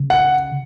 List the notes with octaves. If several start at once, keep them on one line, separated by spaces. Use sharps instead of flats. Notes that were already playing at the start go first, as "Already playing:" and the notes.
Already playing: C#3
F#5